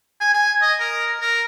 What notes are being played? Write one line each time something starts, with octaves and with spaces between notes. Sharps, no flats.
G#5
G#5
D#5
A#4
A#4